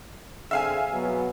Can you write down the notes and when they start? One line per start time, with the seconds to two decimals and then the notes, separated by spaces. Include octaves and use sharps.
0.51 D3 C4 G#4 E5 F5 G#5
0.93 B2 F#3 B3